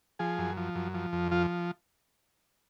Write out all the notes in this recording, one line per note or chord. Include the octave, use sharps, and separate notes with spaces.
F3 G#4
F#2
F3
F#2
F3
F2
F3 F4